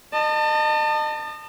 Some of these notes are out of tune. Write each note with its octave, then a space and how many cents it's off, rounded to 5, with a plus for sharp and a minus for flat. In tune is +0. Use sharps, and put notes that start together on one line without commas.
D#5 -35 A5 +25